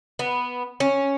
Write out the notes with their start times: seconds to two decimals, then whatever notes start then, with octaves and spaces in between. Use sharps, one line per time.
0.19 B3
0.80 C#4